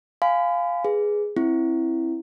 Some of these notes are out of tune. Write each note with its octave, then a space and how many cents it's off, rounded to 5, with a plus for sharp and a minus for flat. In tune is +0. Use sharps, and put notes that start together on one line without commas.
F5 +0 G#5 +0 B5 +45
G#4 +0 B4 +0
C4 +15 E4 +0